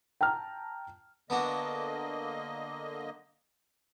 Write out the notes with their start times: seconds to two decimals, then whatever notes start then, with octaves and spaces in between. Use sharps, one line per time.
0.21 G5 A5 A#5 F6
1.30 D3 A#3 B3 D4 F#4 D#5